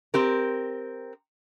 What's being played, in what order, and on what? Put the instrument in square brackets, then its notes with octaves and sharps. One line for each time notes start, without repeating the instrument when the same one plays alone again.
[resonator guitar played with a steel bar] C4 G4 A#4